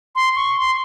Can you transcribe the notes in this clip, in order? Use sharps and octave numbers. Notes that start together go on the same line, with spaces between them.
C6
C#6
C6